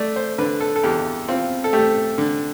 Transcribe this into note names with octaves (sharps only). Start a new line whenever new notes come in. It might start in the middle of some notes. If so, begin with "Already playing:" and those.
Already playing: A3 D5
C5
D3 B4
A4
A4
E2 G4
C4 F4
A4
A3 G4
D3